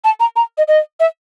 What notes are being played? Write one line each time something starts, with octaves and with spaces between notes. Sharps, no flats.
A5
A#5
A#5
D#5
D#5
E5